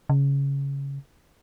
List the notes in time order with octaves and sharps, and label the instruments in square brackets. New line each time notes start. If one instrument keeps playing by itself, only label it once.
[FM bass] C#3